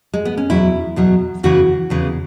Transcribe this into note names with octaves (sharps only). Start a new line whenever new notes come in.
G#3
B3
C#4
E2 B2 F#3 E4
E2 B2 F#3
E2 C#3 E3 F#4
E2 C#3 E3